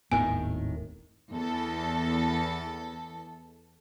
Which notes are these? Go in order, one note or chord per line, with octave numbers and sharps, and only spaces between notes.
D#1 G#1 A2 D#3 B3 G#5
E2 A4